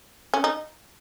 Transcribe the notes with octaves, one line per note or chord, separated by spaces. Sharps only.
C#4
D#4